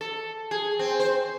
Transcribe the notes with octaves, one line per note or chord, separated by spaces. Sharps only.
A4
G#4
C4
C5